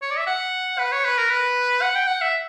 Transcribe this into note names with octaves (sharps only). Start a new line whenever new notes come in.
C#5
D5
E5
F#5
B4
C#5
B4
A#4
B4
F#5
G5
F#5
E5